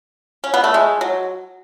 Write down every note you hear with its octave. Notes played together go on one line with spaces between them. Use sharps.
C#4
B3
A3
G#3
F#3